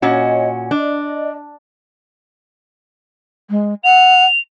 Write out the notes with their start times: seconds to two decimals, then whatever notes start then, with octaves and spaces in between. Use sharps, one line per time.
0.02 A#2 C#4 F#4 C#5 D#5
0.71 D4 D5 D#5
3.50 G#3
3.83 F#5 F7